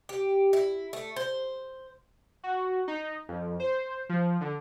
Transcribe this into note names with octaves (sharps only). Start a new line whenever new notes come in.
G4
E4
A3
C5
F#4
D#4
F2
C5
F3
D3